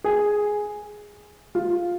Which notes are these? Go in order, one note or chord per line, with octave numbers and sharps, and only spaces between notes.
G#4
F4